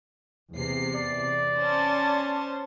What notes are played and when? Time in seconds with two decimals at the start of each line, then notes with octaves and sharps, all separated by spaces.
0.53 E2 C3 C7
0.95 D5
1.60 C#4 C5 A5